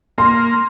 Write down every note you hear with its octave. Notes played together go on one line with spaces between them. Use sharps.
A#3 C6